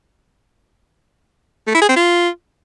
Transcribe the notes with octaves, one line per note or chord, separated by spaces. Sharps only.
A3
E4
G#4
C4
F4